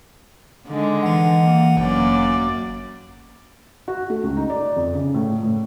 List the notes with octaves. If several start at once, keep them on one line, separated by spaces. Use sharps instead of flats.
D3 D#3 G#3
E3 F#5
A#3
G1 F#2 A#3 D5
F#4
A3
C#2
D#4
D5
F2
C#3
A2
A2